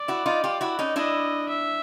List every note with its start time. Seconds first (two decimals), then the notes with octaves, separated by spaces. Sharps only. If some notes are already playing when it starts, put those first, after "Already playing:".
Already playing: D5
0.08 E4 F#4
0.26 D#4 F4
0.44 F4 G4
0.61 E4 F#4
0.79 C#4 D#4
0.96 D4 E4 D#5
1.49 E5